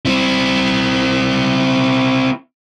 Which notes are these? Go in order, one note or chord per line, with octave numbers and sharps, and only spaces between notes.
C4 E4